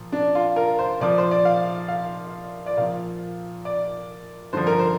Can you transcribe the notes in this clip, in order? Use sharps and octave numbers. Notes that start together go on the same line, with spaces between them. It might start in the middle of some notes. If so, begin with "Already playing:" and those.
Already playing: A#2 F3
D4
F4
A#4
C5
A#2 F3 D5
C5
D5
F5
F5
D5
A#2 F3 F5
D5
G2 D3 F3 C5
A#4
C5